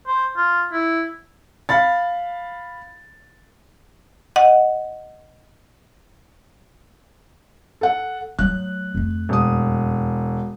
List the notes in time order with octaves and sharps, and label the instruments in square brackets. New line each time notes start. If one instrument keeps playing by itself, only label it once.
[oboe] C5
F4
E4
[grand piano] F5 B5 A6
[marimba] D#5 F#5
[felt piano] A4 F#5
[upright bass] F#3 A3 [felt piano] F#6
[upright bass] F2 A3
[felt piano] E1 D#6